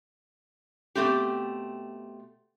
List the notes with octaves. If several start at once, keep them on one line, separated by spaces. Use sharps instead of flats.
B2 F3 A3 C4 G4